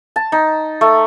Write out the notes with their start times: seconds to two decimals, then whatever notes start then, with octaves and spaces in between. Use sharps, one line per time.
0.16 A5
0.32 D#4
0.81 A3